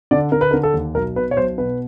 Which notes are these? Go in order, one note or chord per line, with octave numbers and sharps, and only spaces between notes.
D3 D5
D3 A#4
B4
D3 A#4
A4
D#2
B1 A#4
B2 B4
C#5
B1 C5
B2 B4